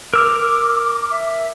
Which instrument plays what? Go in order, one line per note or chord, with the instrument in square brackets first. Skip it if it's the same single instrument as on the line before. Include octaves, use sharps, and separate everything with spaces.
[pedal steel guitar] A#4 E6 F6 [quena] D6
[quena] E5